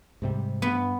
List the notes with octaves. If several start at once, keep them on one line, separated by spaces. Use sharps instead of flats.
G#2 C3 G3
G2 B3